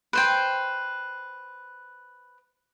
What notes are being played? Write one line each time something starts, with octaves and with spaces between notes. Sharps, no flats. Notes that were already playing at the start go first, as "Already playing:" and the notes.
B4 C5 G5